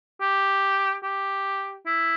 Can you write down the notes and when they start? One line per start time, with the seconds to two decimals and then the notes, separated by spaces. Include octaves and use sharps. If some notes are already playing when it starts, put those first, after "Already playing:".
0.21 G4
1.03 G4
1.86 E4